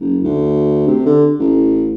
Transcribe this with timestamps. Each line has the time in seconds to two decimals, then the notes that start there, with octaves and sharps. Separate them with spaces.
0.01 F#1
0.24 D2
0.88 C3
1.06 D3
1.40 A1